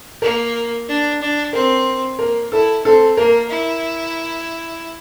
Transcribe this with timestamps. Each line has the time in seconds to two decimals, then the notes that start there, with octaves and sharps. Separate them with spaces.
0.22 A#3 A#4
0.88 D4
1.21 D4
1.53 C4 A#4
2.19 A#3 A#4
2.52 E4 A4
2.85 C4 A4
3.17 A#3 A#4
3.50 E4